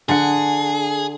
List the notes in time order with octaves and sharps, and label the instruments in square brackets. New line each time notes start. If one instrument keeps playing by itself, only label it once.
[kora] D3 F#5 [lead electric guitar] G#4